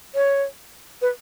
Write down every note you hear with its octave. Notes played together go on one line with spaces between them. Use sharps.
C#5
B4